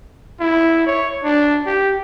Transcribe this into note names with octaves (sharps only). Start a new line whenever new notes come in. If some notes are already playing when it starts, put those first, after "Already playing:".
E4
C#5
D4
G4